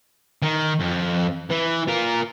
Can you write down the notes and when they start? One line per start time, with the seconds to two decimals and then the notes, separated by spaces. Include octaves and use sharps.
0.42 D#3
0.80 F2
1.50 E3
1.88 F4 A#4